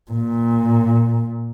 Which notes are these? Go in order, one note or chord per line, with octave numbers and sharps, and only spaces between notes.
A#2